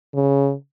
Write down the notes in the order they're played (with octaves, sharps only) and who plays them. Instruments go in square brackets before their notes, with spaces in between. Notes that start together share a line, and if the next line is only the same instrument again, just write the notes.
[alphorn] C#3